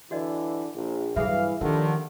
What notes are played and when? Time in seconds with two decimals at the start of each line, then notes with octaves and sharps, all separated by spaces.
0.11 D3 E3 F#4 D5 D#5
0.75 A#1
1.16 G2 E3 F#3 G#4 A4 E5 F5
1.61 D#2 D3 D#3 F3